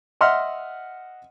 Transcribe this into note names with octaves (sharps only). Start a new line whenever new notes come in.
D#5 E5 F#5 C6 F6